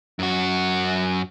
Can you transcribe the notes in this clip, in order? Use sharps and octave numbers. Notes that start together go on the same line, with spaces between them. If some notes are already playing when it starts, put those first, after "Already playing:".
F#2 F#4